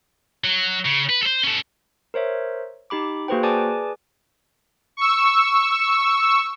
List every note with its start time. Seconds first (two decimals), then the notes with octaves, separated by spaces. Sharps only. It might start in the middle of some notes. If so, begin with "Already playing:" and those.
0.44 F#3
0.85 C#3
1.09 B4
1.22 A4 C5
1.44 C#4 A4
2.14 A#4 C5 C#5 E5
2.90 D#4 G4 B5 D6
3.28 A#3 F#4 G#4 B4 C5 G5
3.43 G#4 B4 D5 G#5 A5 D6
4.97 C#6 E6